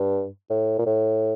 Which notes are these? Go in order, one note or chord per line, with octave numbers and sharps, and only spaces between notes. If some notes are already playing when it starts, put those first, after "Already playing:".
Already playing: G2
A2
A#2
A2